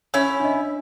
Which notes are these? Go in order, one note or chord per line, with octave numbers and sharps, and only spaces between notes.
C#4 E4 C#5
D4 D#5